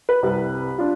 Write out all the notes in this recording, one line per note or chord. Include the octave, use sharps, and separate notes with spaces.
B4
C2 C3 G3
D4 F4